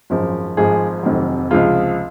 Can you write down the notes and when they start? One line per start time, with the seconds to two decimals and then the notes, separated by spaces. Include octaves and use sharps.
0.10 G#1 F#2 F3 G#3
0.57 G#1 G#2 F3 G#3 G#4
1.03 F1 F2 C3 D#3 F#3
1.50 C#2 C3 F3 G#3 F4